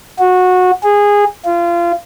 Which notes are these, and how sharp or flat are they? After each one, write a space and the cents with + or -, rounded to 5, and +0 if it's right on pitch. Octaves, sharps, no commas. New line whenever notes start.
F#4 -20
G#4 -15
F4 -25